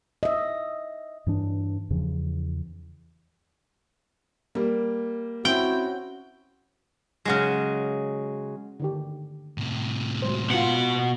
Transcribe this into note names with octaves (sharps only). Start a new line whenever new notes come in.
D#5 E5
G2 E3 D4
E2 C#3 E3 F3
G3 A#3
C4 C#4 E4 F#4 G5
C#3 F#3 G#3
D3 D#3 G4
A2 C3
F#3 G#3 C5
B2 B3 F4 F#5